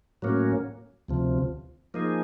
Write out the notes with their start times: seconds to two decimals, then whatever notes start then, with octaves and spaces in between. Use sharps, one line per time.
0.22 A2 F#3 A#3 C#4
1.08 D2 C3 F3
1.94 F3 A#3 D#4 G#4